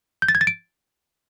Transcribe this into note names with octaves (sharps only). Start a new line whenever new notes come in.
G6
A6
G#6
A6
D7